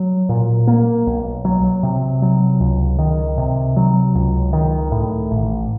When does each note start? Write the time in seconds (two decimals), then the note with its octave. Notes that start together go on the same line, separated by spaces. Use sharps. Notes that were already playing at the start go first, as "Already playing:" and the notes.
Already playing: F#3
0.29 A#2
0.67 A#3
1.06 B1
1.45 F#3
1.83 C3
2.22 F#3
2.60 C#2
2.99 D#3
3.38 C3
3.76 F#3
4.15 C#2
4.53 D#3
4.92 A2
5.30 A1